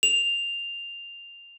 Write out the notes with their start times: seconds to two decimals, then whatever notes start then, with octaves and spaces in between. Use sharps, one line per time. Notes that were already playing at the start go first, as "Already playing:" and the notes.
0.03 F7